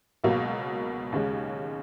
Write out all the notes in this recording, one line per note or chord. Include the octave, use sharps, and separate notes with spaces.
C#2 B2 F#3 A#3
D#2 C#3 G#3